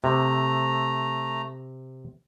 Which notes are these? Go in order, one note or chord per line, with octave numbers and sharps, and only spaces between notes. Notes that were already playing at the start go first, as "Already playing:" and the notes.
C3 A3 A#5